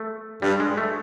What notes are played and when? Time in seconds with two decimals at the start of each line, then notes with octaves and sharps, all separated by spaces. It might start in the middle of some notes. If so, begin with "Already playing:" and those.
Already playing: A3
0.42 G2 G3
0.60 G#3
0.77 A3